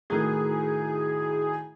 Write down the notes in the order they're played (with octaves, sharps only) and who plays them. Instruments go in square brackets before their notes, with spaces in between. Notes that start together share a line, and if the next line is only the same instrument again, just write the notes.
[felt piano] A2 D#3 [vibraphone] E4 F#4 A#5 [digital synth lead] G#4